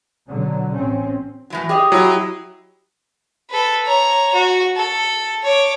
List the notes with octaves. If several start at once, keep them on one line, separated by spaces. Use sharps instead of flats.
B2 D3 F#3
A1 C4 C#4
A2 E3 F#3
G4 G#4 C#5 D#5
F#3 E4
A4 B4
C#5 A#5
F#4
A4
C#5 D6